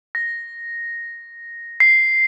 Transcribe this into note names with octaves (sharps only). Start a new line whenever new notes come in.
A#6
C7